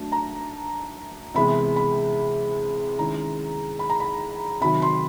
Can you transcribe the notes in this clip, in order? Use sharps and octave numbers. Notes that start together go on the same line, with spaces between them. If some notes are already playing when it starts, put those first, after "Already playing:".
Already playing: F#3 A3 D4 A5
A#5
C3 E3 G#3 B3 B5
B5
D#3 G#3 C#4 E4 A#5
B5
A#5
B5
C3 D#3 F#3 B5
C6